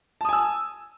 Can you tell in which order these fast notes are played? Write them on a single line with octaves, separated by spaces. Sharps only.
A5 D#6 G#5 E6